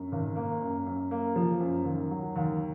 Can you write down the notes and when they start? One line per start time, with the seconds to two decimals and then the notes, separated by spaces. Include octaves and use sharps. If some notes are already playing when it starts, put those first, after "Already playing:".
Already playing: F#2
0.12 G#1
0.36 A#3
0.61 F#2
0.86 F#2
1.11 A#3
1.36 F3
1.60 F#2
1.85 D#2
2.11 F#3
2.36 D#2